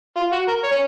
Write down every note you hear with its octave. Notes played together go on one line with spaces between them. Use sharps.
F4
F#4
A#4
C#5
C#4